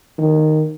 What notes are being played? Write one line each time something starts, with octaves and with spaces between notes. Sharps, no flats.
D#3